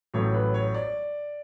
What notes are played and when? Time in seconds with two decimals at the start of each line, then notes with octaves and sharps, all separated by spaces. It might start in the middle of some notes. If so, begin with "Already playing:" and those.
0.14 A1 A2 F#3 C#5
0.34 B4
0.54 C#5
0.74 D5